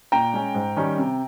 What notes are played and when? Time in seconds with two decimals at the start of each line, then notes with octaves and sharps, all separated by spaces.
0.12 A#2 G5 A#5
0.33 G#3 C#4
0.55 G#2
0.76 D#3 G3 C#4
0.98 C3